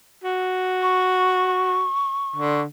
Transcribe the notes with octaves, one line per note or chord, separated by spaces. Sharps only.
F#4
C#6
D3